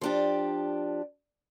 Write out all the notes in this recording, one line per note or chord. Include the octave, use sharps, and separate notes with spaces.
F3 D4 G4